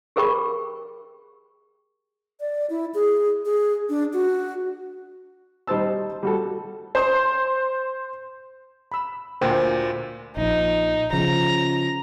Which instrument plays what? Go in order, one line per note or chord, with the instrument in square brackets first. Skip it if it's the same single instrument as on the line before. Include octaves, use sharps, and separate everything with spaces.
[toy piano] G4 G#4 A#4 G5 B5 C#6
[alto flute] D5
E4
G#4
G#4
D4
F#4
[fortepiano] G3 D#4 C5 A5 E6
G3 F#4 A4
[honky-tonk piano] C5 C6
[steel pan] B5 E6
[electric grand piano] D2 A#2 [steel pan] C5 G5 G#5
[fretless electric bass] A#1 F3 [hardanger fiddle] D#4
[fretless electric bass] C#3 F3 [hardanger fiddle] A#5